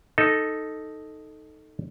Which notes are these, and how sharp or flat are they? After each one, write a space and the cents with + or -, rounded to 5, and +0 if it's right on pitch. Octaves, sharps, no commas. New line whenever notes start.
D#4 +0 A4 +0